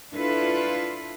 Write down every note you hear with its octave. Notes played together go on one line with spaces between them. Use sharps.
D4 E4 F4 A4 B4